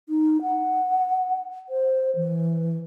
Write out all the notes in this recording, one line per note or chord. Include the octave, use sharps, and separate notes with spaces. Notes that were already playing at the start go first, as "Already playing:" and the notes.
D#4
F#5
C5
E3